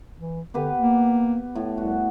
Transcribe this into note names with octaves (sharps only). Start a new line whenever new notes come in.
E3
D3 B3 G4 B4
A#3
A2
C2 F#4